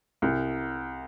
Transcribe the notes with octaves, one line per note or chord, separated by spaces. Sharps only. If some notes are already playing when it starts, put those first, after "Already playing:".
C2